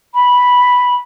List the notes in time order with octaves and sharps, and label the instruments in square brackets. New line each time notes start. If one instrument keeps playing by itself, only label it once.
[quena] B5